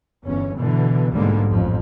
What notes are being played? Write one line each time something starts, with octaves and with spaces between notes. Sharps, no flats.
G1 E2 C#4
B2 D3 E3
B1 G#2 D3 G3 G#3 A#3
A1 F2 F3